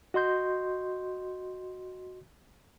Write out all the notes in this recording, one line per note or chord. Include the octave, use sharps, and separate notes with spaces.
F#4 D#5 C6 G6